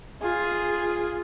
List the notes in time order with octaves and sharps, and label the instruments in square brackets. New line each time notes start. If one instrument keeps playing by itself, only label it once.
[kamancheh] F4 G#4